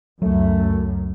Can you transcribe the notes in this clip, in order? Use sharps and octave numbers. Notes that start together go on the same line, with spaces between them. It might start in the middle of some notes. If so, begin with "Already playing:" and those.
C#2 F#2 F#3 A3